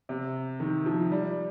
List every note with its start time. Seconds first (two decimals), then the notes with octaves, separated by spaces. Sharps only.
0.09 C3
0.60 D#3
0.86 F3
1.12 G3